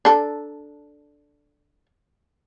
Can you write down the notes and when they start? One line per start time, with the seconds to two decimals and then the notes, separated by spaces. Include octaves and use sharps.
0.05 D4 A4